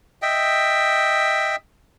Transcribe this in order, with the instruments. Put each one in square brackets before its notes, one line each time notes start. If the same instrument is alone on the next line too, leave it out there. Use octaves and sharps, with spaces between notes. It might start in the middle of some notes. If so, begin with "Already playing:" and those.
[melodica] D#5 E5 G5